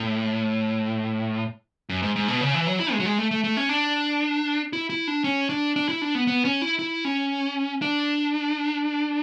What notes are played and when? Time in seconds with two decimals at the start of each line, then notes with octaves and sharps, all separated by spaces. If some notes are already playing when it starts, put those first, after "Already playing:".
Already playing: A2
1.89 F#2
2.02 G#2
2.16 G#2
2.28 B2
2.41 C#3
2.54 E3
2.67 F#3
2.80 E4
2.93 G#3
3.00 F#3
3.06 G#3
3.18 A3
3.31 A3
3.44 A3
3.57 C#4
3.69 D4
4.73 E4
4.90 E4
5.07 D4
5.24 C#4
5.50 D4
5.76 D4
5.89 E4
6.02 D4
6.15 B3
6.27 B3
6.45 C#4
6.62 E4
6.79 E4
7.05 C#4
7.82 D4